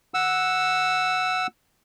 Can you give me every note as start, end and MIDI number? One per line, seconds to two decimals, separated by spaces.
0.14 1.47 78
0.14 1.47 88